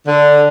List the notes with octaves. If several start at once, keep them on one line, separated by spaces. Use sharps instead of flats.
D3